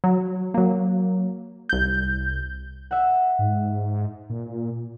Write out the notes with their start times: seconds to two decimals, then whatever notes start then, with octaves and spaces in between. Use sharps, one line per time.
0.04 F#3
0.54 F#3 A#3
1.69 C2 G6
2.91 E5 F#5
3.39 G#2
4.30 A#2